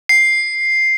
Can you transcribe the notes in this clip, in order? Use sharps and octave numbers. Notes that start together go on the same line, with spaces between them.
C7